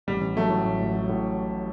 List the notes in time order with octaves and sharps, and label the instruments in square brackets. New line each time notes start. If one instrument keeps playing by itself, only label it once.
[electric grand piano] A1 [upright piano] G3
[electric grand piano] A1
[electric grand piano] F#3 [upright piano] A3
[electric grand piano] A2
A1
A1
F#3
A2